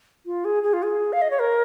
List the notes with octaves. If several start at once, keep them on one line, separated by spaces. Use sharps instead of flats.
F4
G#4
G#4
F4
G#4
F5
D#5
C#5
A#4